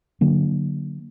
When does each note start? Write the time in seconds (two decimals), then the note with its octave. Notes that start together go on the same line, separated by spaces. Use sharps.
0.21 D3 F#3 A#3